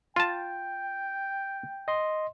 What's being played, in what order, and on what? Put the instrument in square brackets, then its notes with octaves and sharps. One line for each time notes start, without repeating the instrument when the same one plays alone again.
[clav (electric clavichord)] F4 A5 [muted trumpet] G5
[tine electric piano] D#5 C6